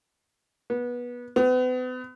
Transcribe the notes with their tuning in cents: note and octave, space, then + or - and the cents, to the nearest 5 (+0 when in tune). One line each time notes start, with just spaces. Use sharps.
B3 -20
B3 +40